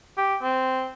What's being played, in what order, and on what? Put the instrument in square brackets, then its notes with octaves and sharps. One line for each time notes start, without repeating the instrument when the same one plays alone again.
[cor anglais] G4
C4